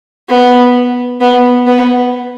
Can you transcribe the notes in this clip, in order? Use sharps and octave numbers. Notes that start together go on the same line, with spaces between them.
B3
B3
B3